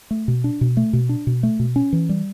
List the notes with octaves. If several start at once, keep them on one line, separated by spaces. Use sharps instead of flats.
A3
B2
D4
B2
A3
B2
D4
B2
A3
B2
C#4
E3
G3